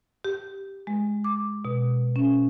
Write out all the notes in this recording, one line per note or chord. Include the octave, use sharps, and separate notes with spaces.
G4
G#3
D6
B2
C#4